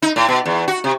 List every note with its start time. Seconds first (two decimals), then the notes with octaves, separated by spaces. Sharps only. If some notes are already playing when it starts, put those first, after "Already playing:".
0.02 D#4
0.16 A2
0.29 B2
0.46 E2
0.68 F#4
0.84 C3